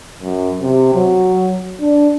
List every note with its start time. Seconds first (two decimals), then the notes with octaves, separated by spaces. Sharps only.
0.20 F#2
0.60 C3
0.95 F#3
1.81 D4